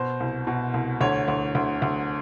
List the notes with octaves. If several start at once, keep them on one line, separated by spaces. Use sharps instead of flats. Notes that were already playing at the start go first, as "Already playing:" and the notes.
Already playing: B2 C5
C2
B2
C2
D2 C#5
D2
D2
D2